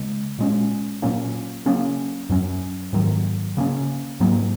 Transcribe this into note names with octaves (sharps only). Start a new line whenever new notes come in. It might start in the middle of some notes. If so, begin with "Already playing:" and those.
Already playing: C#3 G#3
A#2 G#3 C#4
A#2 F#3 A#3 C#4
C#3 F#3 A#3 C#4
F#2 F#3 C#4
G#2 D#3 F#3
C#3 A#3 C#4
G#2 F#3 A#3